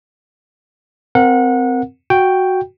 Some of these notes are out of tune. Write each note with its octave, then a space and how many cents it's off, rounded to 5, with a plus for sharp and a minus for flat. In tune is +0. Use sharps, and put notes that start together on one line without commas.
C4 -15 A#4 +0 F#5 -25
F#4 +0 G5 +0